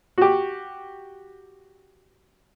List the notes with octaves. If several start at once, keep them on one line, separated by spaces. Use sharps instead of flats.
F#4 G4